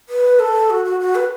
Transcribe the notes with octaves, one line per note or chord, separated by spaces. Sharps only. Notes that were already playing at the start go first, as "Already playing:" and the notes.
B4
A4
F#4
F#4
F#4
B4